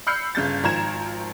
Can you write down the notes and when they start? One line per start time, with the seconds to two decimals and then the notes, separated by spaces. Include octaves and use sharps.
0.07 B5 E6 F6 G6 C7 C#7
0.35 G1 C#3 G6 A6
0.63 G#1 D#3 F3 A#5 G#6 E7